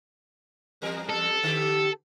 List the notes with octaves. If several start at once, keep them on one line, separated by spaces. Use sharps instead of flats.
E2 G3 A#4
A4
D3 G4